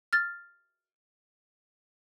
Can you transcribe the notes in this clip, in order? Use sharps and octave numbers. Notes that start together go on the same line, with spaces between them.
F6 A6